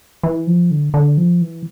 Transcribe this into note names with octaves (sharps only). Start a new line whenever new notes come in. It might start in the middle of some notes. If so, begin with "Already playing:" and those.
E3
F3
D3
D3
F3
E3